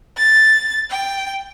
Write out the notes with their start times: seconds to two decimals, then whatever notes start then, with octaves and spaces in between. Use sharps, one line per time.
0.17 A6
0.91 G5